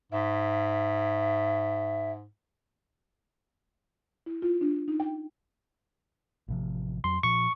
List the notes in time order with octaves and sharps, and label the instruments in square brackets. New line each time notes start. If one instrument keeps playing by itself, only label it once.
[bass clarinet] G#2 [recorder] E5
[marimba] E4
F4
D4
D#4
G5
[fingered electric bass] A1 C3 F3
[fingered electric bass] F2 F#3 [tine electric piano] C6
[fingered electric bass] A#2 F3 [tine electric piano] C#6